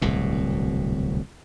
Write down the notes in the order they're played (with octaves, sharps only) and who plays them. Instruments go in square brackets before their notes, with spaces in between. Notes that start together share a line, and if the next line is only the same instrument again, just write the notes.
[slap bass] D1 C2 B2